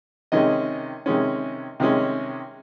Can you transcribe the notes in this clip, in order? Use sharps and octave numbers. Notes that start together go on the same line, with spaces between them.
C3 D#3 G#3 C#4 D#5
C3 D#3 G#3 C#4
C3 D#3 G#3 C#4